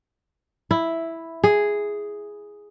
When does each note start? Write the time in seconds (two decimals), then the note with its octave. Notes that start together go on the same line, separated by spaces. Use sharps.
0.71 E4
1.44 G#4